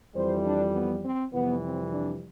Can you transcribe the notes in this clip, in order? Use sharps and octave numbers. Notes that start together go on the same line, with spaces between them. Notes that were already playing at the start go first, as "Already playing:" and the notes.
F2 E3 G3 C5
D4
B3
C4
F2 C3 E3 G3 B3
C4
D4